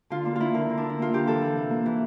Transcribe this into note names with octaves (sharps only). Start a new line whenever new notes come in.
D3 F4
A#3 D4
A#3 E4 F4
D3 A#4
D3
D4
D3
E4
A#3 F4
D3 G4
E3 A4
E3
C3
A#3
E3